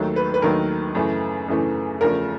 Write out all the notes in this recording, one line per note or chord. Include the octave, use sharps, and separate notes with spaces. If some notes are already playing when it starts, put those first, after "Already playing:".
Already playing: D#2 D#3 F#3 A3
B4
B4
D#2 D#3 F#3 A3 A#4
F#2 C#3 E3 A3
F#2 C#3 E3 A3
E2 C#3 F3 A3 A#4